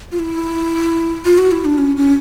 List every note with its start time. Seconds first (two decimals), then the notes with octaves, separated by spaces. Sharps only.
0.12 F4
0.19 E4
1.25 F4
1.38 F#4
1.51 E4
1.65 D4
1.78 C#4
1.96 C#4